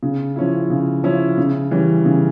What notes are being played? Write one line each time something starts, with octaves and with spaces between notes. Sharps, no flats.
C#3
F3 C#4 E4
C#3
F3 C#4 E4
C#3
E3 G3 C#4
C#3